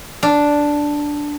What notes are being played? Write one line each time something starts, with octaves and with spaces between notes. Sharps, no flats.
D4